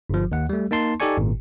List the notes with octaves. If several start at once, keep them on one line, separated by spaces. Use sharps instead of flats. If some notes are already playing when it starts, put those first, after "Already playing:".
G1 F3
D#2 F#5
G3 A3
A#3 D#4 A5 C6
D#4 G4 A4 D5 G#5 C#6
G#1 A#2